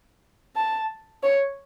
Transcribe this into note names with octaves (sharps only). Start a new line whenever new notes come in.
A5
C#5